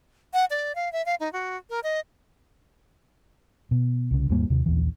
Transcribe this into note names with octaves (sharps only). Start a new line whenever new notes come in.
F#5
D5
F5
E5
F5
D#4
F#4
A#4
D#5
B2
C2 C#3
D#2 G#2 G3 A#3
D#2 C3
A#1 D#2 E3